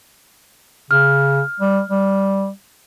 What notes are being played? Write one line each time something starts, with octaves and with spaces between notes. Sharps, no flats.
C#3 F6
G3
G3